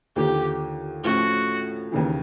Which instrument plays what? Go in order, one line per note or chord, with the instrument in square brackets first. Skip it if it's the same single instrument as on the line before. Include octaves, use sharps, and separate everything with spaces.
[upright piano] D#2 D3 F3 [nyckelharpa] G4
[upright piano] A2 F3 A3 C#4 [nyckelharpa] F#4
[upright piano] D#2 C#3 E3